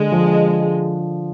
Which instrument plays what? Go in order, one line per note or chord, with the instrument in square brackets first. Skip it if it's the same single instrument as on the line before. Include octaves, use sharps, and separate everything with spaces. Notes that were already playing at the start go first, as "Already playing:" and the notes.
Already playing: [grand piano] D3 [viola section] G#3
[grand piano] F3